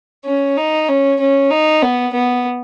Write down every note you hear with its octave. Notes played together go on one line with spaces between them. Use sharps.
C#4
D#4
C#4
C#4
D#4
B3
B3